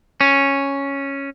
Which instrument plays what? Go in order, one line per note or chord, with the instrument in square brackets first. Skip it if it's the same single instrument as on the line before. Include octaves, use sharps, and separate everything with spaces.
[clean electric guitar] C#4